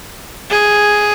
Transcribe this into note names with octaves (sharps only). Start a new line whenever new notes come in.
G#4